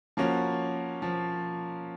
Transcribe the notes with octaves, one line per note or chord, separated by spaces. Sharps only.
F3 A#3 C#4 F#4
F3